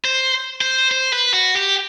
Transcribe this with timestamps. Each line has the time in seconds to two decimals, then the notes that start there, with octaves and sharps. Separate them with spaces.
0.05 C5
0.61 C5
0.91 C5
1.13 B4
1.34 F#4
1.56 G4